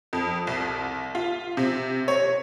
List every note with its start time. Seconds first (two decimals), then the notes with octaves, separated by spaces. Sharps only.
0.13 F2
0.47 C2
1.15 F4
1.57 C3
2.08 C#5